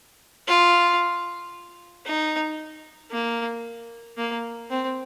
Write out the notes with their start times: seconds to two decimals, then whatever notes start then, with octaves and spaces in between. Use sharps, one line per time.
0.48 F4
2.06 D#4
3.11 A#3
4.17 A#3
4.70 C4